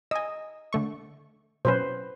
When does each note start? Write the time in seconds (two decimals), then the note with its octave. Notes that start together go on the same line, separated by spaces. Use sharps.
0.11 D#5 G#5 E6
0.73 D3 A3 C#6
1.65 B2 F#3 C#4 B4 C5